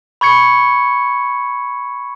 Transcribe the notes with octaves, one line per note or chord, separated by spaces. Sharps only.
B5 C#6 G#6 C#7